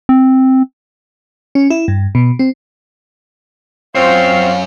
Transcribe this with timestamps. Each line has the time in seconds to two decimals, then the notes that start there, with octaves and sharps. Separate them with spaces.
0.09 C4
1.55 C#4
1.70 E4
1.88 G2
2.15 B2
2.39 C4
3.95 F#2 C4 C#4 F4 C5 C#5 F5